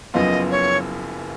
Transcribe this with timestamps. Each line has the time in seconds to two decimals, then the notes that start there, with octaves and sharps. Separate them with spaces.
0.14 F#1 F#2 F3 B3 F4 D#5
0.51 C#5